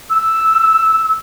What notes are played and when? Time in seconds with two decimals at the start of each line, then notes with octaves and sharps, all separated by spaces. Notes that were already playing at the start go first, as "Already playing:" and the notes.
0.10 E6